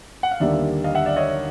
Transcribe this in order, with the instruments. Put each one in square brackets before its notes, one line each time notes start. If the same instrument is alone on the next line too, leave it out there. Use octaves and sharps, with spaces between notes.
[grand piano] F#5
F5
D#2 D3 G3 A#3 D5 E5
D#5 F5
E5 F#5
D5 E5
C#5 D#5